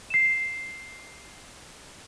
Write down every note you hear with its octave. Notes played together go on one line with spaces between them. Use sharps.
C7 E7